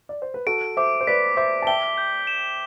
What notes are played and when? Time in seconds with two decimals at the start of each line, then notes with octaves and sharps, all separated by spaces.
0.09 D5
0.22 C5
0.34 B4
0.47 F#4 A4 D7
0.77 C5 E5 D6
1.01 C5
1.07 B4 D5 B6
1.37 C5 E5 D6
1.62 A5
1.67 E5 G5 G7
1.98 G6
2.27 E7